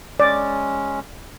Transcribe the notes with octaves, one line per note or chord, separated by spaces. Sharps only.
G#3 C#4 D5